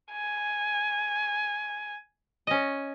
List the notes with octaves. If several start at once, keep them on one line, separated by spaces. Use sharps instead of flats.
G#5
C#4 D#5